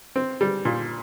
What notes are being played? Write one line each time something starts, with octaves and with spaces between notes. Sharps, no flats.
C4
G3
A#2